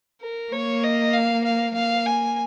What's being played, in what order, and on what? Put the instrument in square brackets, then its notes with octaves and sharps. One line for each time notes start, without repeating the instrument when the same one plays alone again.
[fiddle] A#4
[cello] A#3 [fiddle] C#5
[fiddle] D#5
F5
F5
[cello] A#3 [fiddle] F5
[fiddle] G#5